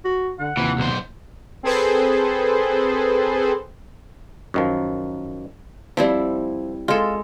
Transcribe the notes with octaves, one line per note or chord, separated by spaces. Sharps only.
F#4
D3 F#5
D#2 C3 E3 F3
B1 C5
C4 G#4 A4 B4 C5
F#2 D#3 F3
F3 G3 C4 E4
G#3 F4 A4